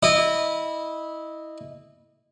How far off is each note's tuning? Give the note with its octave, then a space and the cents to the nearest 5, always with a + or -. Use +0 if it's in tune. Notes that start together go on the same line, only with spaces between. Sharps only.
E4 -20 D#5 -20